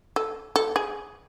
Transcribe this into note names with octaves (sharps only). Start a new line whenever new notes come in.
A4
A4
G#4